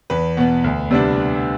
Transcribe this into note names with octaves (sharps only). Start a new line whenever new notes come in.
E2 B4
B2 B3
D2
C3 G3 B3 D4